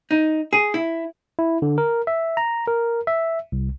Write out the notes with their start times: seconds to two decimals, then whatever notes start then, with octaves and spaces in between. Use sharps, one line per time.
0.11 D#4
0.53 G#4
0.74 E4
1.39 E4
1.62 D3
1.78 A#4
2.07 E5
2.37 A#5
2.67 A#4
3.07 E5
3.52 C2